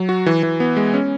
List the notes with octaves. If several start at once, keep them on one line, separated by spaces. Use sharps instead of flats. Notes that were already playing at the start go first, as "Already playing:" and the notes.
Already playing: F#3
F#4
E3
E3
B3
G#3
C#4